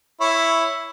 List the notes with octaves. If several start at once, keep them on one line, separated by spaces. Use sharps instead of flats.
E4 C#5